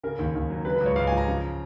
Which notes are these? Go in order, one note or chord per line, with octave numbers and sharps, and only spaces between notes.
C#3 A#4
D#2
D#2
F#3
C#3 B4
B4
C#2
C#5
C#2 F5
G#5
F3
A#5
C#3